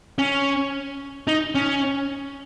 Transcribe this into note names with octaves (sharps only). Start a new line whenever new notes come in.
C#4
D#4
C#4